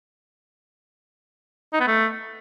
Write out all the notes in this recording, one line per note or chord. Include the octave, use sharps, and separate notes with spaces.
D#4
B3
A3